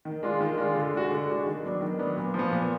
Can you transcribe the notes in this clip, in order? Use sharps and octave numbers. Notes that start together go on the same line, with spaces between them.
D#3
G#3 D4 F4
D#3
G#3 D4 F4
D3
G#3 D4 F#4
D3
G#3 D4 F#4
D#3
F#3 B3 D4
D#3
F#3 B3 D4
A#2
F3
B3
A#2